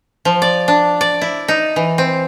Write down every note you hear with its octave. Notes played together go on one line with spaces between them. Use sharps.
F3
D5
D4
D5
E4
D#4
E3
C4